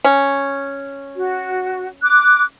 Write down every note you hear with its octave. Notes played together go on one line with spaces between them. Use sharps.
C#4
F#4
D6 F#6